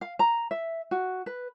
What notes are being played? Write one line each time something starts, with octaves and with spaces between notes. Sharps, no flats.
F5
A#5
E5
F#4
B4